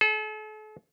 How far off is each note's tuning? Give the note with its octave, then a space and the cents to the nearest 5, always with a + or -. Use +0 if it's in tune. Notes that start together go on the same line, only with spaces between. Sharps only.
A4 -45